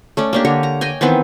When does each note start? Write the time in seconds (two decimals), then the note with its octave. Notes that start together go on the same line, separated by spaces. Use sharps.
0.17 A3 C#4 D5
0.33 A#3 D4 G4
0.45 D3 A#4 C#5 C#6
0.63 A#5
0.81 D#5 G5 G#5
1.01 D#3 E3 B3 C4